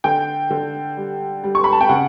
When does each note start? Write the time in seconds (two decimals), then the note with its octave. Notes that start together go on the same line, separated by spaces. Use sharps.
0.04 D3 G5
0.50 D3
0.97 G3
1.44 G3
1.55 C#6
1.64 B5
1.72 A5
1.81 G5
1.89 C#3 F#5